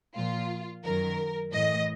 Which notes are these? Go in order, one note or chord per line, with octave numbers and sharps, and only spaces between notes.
A#2 F3 F4
F#2 D#3 F#3 A#4
A2 E3 D#5